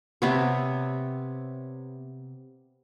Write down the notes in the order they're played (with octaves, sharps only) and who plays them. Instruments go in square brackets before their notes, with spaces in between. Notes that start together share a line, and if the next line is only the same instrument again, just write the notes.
[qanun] C3 B3 C#5